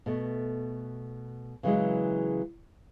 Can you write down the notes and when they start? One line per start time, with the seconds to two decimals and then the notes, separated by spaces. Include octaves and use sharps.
0.06 B2 A3
1.63 C#3 E3 F#3 G#3